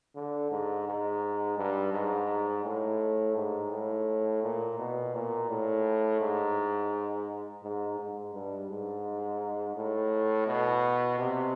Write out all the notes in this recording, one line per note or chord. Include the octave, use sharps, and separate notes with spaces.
D3
G#2
G#2
G2
G#2
A2
G#2
A2
A#2
B2
A#2
A2
G#2
G#2
G#2
G2
G#2
A2
B2
C3